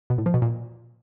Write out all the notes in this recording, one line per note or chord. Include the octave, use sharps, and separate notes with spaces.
B2
A2
F3
B2
A#2